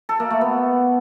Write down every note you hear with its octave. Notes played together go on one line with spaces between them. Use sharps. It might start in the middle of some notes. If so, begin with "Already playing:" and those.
A4
A#3
A3
B3